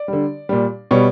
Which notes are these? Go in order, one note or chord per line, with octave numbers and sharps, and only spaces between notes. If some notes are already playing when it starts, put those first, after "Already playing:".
Already playing: D5
D3 G3
A#2 G3
B2 G3 C#5